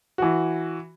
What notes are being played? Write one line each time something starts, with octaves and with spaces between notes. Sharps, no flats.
E3 F#4